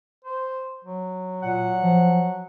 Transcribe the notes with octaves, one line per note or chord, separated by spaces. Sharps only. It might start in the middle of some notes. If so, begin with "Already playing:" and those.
C5
F#3
A#2 F#5
F3